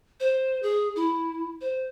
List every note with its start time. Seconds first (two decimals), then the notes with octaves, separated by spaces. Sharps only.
0.20 C5
0.63 G#4
0.96 E4
1.61 C5